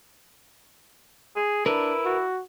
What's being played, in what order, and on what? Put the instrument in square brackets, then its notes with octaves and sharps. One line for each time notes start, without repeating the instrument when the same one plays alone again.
[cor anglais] G#4
[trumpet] D4 [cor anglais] E4 [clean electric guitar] A#4 B4
[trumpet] F#4